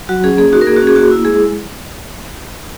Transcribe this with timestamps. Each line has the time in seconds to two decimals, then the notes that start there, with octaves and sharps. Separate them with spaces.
0.09 F#3 F#4
0.24 C#4 G#4
0.37 A#3 G#4
0.52 D#4 F#4
0.61 A#4
0.67 A#3 G#4
0.76 F#4
0.82 C#4 G#4
0.96 A#3 F#4
1.11 E4
1.25 G#3 G#4